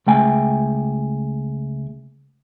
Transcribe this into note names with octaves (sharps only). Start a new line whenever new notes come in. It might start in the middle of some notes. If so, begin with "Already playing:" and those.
C#2 A3 G5 G#5